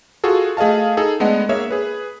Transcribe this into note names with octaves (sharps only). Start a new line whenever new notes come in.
F4 F#4 G#4 A4
A3 G#4 D#5 F5 A5
D#4 G#4 A4
G#3 A3 B3 D4 D#5 F#5
A#3 G#4 C#5 E5
G#4 B4